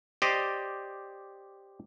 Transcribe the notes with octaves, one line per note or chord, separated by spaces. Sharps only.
G4 C5 D5 D#5